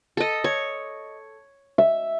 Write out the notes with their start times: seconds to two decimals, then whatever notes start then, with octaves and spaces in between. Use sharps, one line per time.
0.17 A4 D#5
0.44 C#5
1.78 E5